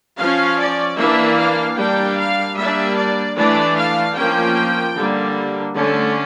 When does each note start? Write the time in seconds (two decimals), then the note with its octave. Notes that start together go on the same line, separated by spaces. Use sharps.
0.18 F3 C#4 F5
0.58 D5
0.98 E3 A#3 D4 E5
1.39 F5
1.78 G3 A#3 D4 G5
2.17 F5
2.57 G3 A#3 D4 E5
2.97 D5
3.37 E3 A3 D4 D5
3.78 F5
4.16 F3 A#3 C#4 G5
4.96 D3 G3 A#3
5.76 D3 A3 C#4